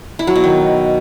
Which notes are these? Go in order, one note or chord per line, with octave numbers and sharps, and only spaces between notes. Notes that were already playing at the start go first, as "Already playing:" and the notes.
E4
F#3
B2
D#3